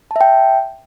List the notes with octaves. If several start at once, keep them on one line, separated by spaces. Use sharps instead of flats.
E5 G5 A5